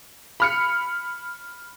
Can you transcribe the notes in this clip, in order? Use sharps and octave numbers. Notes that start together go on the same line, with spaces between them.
B5 F6 C#7